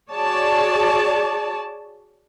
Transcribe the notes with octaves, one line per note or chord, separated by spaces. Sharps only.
F#4 G#4 C#5 D5 A5